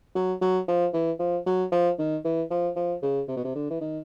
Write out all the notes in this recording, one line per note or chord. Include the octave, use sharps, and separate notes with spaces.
F#3
F#3
F3
E3
F3
F#3
F3
D#3
E3
F3
F3
C#3
C3
B2
C3
D3
E3
D#3